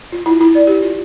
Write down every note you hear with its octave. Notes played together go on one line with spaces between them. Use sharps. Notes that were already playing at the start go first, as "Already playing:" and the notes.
F4
E4
E4
D5
G4
F4